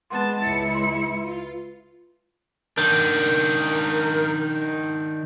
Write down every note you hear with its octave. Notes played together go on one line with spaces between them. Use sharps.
G#3 B3 B4 F#5 A5 C6
C#2 E4 C#7
B4 C6
F4
D#3 D4 A#4 G6